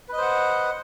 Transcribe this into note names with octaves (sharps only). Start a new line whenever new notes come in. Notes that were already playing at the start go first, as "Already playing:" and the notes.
B4 C5 D#5 F#5